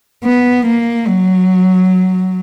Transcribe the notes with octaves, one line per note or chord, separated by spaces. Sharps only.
B3
A#3
F#3